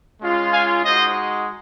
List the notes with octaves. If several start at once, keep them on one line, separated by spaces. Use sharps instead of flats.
G#3 C#4 F4
F5 G#5
G#3 D#4 F#4 C5 D#5